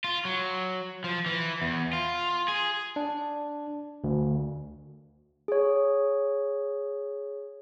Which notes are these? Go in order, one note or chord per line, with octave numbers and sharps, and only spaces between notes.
F4
F#3
F3
E3
E2
F4
G#4
D4
D2
G#4 C#5